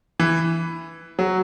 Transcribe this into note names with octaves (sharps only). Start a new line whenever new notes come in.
E3
F#3